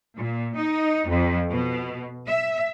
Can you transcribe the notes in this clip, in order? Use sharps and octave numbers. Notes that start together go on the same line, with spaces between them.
A#2
D#4
F2
B2
E5